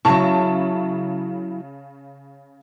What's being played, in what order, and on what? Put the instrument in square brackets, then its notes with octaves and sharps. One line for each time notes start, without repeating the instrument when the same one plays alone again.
[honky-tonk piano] C#3 A5 C#6 [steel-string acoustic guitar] F#3 E4